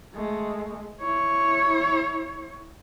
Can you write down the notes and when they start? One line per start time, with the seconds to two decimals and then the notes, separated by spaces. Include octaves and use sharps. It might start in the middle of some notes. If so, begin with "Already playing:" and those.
0.15 G#3 A3
1.01 E4 C#5